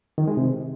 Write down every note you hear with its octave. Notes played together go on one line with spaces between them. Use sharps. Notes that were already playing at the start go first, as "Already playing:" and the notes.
D#3
G#3
C3